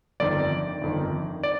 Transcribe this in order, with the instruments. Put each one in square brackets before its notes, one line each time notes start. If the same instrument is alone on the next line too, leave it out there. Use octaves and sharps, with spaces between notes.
[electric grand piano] G1 F2 D#3 D5
G1 F2 D#3
D5